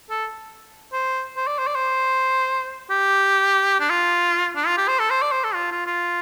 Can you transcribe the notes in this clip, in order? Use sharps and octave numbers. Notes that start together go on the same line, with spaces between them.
A4
C5
C5
D5
C5
D5
C5
G4
D4
F4
D4
F4
G4
C5
A4
C5
D5
C5
A4
F4
F4
F4